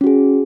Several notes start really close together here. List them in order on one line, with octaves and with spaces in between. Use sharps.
C#4 F#4 G#4